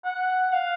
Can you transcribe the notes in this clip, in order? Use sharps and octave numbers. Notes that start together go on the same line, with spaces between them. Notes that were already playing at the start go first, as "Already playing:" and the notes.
F#5
F5